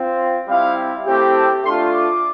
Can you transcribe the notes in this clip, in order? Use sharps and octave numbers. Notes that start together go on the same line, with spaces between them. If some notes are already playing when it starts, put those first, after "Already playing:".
Already playing: C4 F4
G3 C4 E4 F5
A3 C4 E4 G4
A5
A3 D4 F4 C6
D6